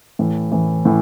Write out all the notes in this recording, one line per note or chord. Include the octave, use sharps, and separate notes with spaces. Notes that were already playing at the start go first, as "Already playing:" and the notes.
A2 E3
A2 E3
A2 E3